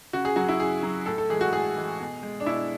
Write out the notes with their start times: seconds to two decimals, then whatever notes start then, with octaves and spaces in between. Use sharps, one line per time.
0.13 C#3 F#4
0.25 G#4
0.36 F#3 F#4
0.48 E4
0.59 C#3 G#4
0.83 F#3
1.06 A2 A4
1.18 A4
1.29 E3 G#3 G#4
1.41 F#4
1.52 A2 G#4
1.76 E3 G#3
2.00 B2
2.23 G#3
2.40 D4
2.46 B2 E4